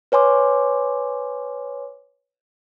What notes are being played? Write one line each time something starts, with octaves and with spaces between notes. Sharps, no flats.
B4 C#5 G#5 C6 D6